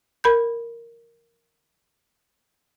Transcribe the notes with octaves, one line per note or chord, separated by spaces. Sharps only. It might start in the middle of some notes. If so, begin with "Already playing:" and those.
A#4 B5 G6